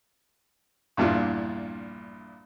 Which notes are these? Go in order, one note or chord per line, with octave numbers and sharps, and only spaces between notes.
A#1 E2 G2 E4 F4 D5